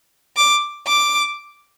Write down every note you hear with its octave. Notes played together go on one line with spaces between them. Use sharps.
D6
D6